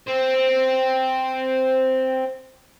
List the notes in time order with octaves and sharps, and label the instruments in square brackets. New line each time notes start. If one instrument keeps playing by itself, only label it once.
[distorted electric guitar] C4 C5